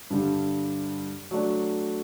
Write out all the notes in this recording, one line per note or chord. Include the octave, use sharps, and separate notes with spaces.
G2 D3 G3
F#3 A3 D4